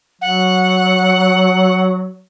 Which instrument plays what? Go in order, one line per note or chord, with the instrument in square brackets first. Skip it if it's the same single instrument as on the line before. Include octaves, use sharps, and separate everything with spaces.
[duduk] F#3 [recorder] F#5